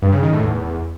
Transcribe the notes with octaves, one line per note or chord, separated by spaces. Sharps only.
G2
C#3
D#3
A2
E2